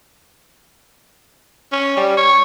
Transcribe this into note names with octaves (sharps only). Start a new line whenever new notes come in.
C#4
G3
C#5